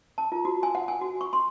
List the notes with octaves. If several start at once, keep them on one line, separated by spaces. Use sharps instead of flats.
A5
F4
F#4
G#5
F#5
G#5
F#4
C#6
C6